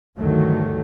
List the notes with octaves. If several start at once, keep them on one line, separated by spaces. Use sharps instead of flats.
D2 G2 D#3 E3 F#3 A3